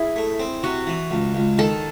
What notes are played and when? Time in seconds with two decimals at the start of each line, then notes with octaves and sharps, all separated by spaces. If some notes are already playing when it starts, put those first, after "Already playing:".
Already playing: E4 G#4
0.16 A3
0.39 C4
0.63 C3 F#4
0.87 E3
1.11 C#2
1.35 C#2
1.58 D#3 A4